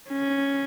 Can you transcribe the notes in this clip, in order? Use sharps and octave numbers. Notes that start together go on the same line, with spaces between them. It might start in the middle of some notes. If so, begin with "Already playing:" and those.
C#4